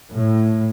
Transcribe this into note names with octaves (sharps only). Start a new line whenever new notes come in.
A2